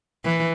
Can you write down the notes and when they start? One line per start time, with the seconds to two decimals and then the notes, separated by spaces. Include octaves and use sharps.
0.25 E3